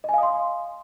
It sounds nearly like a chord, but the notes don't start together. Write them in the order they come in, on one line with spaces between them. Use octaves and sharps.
D#5 G#5 F5 D#6 C6